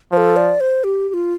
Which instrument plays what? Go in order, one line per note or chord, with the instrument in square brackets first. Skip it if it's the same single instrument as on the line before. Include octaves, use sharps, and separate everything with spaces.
[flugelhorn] F3 [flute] C5
[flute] A4
D5
C5
G4
G4
F4